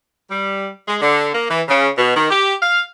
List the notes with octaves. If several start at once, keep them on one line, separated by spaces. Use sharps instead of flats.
G3
G#3
D3
A#3
E3
C#3
B2
D#3
G4
F5